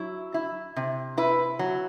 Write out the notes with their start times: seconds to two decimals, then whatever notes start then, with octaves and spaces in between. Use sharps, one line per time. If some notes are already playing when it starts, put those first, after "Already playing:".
Already playing: F#3 E4
0.34 E4
0.76 C3
1.18 E4 B4
1.59 F#3